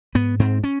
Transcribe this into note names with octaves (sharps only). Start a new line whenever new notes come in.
G#2 B3
G#2 C4
C#4